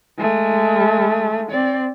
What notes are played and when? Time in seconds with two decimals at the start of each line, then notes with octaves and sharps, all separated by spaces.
0.19 G#3 A3
1.51 C4 D5